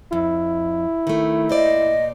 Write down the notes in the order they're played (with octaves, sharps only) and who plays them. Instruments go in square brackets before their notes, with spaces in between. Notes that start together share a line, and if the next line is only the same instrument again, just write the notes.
[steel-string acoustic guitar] F2 [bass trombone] E4
[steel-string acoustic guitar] D#3 A3
[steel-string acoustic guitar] A#2 C5 D5 [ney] D#5